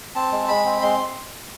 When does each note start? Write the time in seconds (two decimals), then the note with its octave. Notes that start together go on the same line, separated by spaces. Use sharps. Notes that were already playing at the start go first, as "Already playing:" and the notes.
0.15 C4 A5
0.32 G#3
0.48 G#3 B5
0.66 C4
0.82 G#3 C6